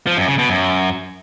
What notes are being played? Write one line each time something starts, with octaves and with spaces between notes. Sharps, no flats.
F3
F#2
C#3
B2
F#2